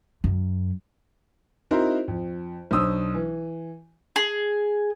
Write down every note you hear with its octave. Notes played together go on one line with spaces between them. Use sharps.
F#2
C4 D#4 E4 F#4 A#4 C5
F2
B1 D4 C5 D#6 E6
E3
G#4